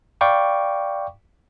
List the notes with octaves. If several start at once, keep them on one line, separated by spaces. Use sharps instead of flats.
D5 F5 G5 B5 C#6 D6